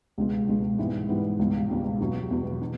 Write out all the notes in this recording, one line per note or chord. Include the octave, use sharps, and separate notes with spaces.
C#2 B2 G#3
C#2 B2 G#3
G#2 E3 G3 B3
G#2 E3 G3 B3
C#2 B2 G3
C#2 B2 G3
E2 B2 F#3
E2 B2 F#3
B2